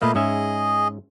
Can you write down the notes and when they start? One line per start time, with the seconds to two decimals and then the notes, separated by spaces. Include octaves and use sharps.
0.02 A#2 A3 A#3 B4 D#5 F5
0.15 G#2 C#4 G#4 D#5 E5